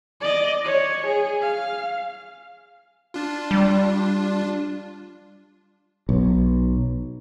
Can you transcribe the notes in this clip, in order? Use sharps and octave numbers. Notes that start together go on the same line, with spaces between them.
D5 D#5
C#5
G#4
F5
D4 F4
G3
B1